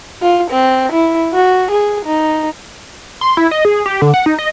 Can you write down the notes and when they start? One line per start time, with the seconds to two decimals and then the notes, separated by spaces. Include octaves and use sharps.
0.22 F4
0.51 C4
0.92 E4
1.34 F#4
1.71 G#4
2.06 D#4
3.21 C6
3.37 E4
3.51 D#5
3.65 G#4
3.86 G4
4.02 D3
4.14 F#5
4.26 D#4
4.39 D#5